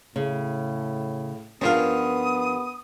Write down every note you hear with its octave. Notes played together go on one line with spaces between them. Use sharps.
A2 C#3
G2 F3 B3 C#4 A#4 F5 D#6